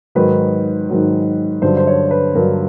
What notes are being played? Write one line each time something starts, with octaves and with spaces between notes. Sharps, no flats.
G#2 D#3 F#3 B4
G#2 D#3 F#3
G2 D3 F#3 C5
C5
C#5
B4
G2 D3 F#3 A#4